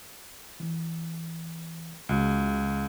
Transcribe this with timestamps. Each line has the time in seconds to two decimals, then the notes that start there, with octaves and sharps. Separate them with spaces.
0.60 E3
2.09 C#2 C#3 F#4